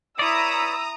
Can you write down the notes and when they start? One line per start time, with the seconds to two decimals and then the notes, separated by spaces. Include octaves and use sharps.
0.19 E4 B4 C#5 D5 A#5 D#6 E6